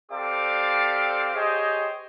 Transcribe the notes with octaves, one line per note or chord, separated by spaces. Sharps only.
C4 G4 A4 D5 F5 D6
G4 G#4 C5 C#5 D#5